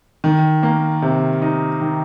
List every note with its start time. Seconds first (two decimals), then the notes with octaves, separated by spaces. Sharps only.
0.24 D#3
0.63 A#3
1.02 C3
1.42 D#4
1.81 D#3